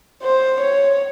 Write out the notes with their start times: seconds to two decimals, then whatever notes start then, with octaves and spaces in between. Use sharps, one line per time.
0.23 C5
0.60 C#5